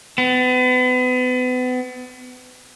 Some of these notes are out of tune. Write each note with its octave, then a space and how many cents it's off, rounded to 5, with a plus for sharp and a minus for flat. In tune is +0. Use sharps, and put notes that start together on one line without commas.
B3 +35